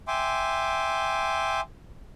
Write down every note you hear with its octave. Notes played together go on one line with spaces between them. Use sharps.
E5 G5 G#5 C6 D6